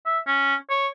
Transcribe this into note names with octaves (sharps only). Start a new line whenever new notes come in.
E5
C#4
C#5